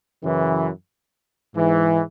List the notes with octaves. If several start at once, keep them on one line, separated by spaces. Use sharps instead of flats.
F#2 C#3 E3
G#2 E3